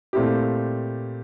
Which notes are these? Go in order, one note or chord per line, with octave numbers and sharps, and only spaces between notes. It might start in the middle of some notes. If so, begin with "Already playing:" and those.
A#2 A3 C4 E4 G4